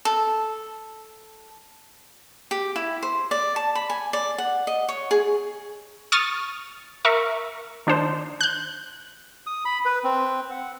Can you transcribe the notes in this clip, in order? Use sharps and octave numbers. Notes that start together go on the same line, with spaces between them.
A4
G4
E4
C5
D5
A5
B5
G#5
D5
F#5
D#5
C#5
G#4
C#6 D#6 F6 A6
A#4 E5 C#6
D#3 D4 D#4 C5
F#6 G6
D#6
B5
B4
C4
F#5